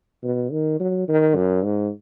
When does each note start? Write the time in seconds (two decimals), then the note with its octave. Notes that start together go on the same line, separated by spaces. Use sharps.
0.23 B2
0.52 D#3
0.80 F#3
1.08 D#3
1.36 F#2
1.64 G#2